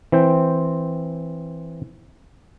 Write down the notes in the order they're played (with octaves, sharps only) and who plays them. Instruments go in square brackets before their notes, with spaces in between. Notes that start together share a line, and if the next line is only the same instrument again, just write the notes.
[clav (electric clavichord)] E3 C4 C5 G5